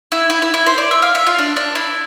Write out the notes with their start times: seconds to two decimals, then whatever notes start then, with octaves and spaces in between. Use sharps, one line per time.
0.12 E4
0.30 E4
0.42 E4
0.54 E4
0.66 C5
0.78 D5
0.91 E5
1.02 F5
1.15 E5
1.27 F4
1.38 D4
1.56 D4
1.75 E4